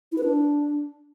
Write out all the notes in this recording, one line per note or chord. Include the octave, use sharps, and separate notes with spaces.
E4
B4
D4